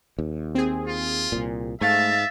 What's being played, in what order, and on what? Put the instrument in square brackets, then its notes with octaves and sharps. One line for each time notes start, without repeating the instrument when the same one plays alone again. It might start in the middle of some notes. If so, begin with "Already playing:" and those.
[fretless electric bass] D#2
[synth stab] C4 G#4
[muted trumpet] F4
[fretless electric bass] C2 A#2
[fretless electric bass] G#2 [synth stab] A3 [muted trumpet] E5 [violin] F5 A6